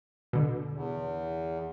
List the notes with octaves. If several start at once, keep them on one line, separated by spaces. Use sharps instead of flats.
B2 D3
E2